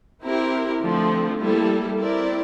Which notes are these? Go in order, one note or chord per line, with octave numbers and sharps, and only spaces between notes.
C4 E4 G4 A#4
D3 F3 A3 C4
G3 A#3 E4 A4
C4 E4 A#4 D5